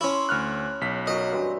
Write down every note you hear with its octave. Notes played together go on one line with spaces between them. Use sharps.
C#4 E4 C#5 A5 C6
D2 F6 F#6
B1 B6
F#2 F#3 C#5 D#5
G2 E3 C4